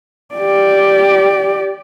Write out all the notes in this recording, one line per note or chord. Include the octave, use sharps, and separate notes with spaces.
G4 D5